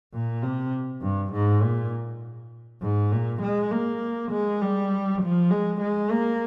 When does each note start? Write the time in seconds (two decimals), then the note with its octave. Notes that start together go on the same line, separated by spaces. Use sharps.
0.13 A#2
0.43 C3
1.02 G2
1.33 G#2
1.62 A#2
2.81 G#2
3.12 A#2
3.42 G#3
3.71 A#3
4.31 G#3
4.62 G3
5.21 F3
5.51 G#3
5.81 G#3
6.11 A#3